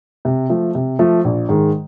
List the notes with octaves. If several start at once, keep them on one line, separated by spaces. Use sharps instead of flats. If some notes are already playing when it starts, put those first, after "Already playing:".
C3
F3 A3
C3
F3 A3
A#1
G#2 D#3 G#3